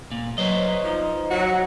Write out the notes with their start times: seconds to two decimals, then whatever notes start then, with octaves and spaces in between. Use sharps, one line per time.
0.12 A#2
0.38 F#3 B4 C5 D#5
0.60 F#3
0.84 F3 D#4
1.31 F#3 F#4 F#5